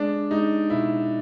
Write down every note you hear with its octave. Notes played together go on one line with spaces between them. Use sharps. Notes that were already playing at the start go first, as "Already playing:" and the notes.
Already playing: G#3 D4
G#3 D#4
B2 E4